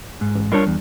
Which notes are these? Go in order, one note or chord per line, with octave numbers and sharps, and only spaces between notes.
G#2
A1
G3 D4 F4 A#4 C#5
E2